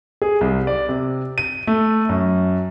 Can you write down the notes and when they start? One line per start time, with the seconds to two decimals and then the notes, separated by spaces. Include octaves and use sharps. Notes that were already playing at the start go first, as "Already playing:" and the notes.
0.22 G#4
0.41 C2
0.67 D5
0.89 C3
1.38 D#7
1.67 A3
2.09 F#2